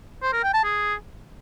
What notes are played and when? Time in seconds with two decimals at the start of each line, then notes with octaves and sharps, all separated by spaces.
0.23 C5
0.33 A#4
0.43 G5
0.54 A5
0.64 G#4